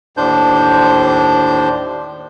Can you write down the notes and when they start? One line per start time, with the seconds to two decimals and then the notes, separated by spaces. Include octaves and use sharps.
0.17 D#2 A2 D4 C5 G6